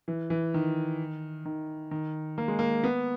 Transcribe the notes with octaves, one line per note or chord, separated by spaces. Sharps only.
E3
E3
D#3
D#3
D#3
A#3
G#3
A#3
B3